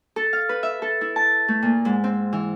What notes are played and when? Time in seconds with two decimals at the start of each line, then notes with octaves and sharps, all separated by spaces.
0.16 A4
0.33 F5
0.49 B4
0.63 E5
0.82 A4
1.01 E4
1.16 A5
1.48 A3
1.62 A#2
1.85 G#2
2.04 C4
2.33 E3